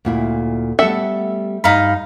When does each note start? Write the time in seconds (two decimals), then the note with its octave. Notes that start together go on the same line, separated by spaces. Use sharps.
0.05 D2 A#2 E4
0.79 G3 A3 B3 A4 E5 F#5
1.64 G2 D#4 F5 B5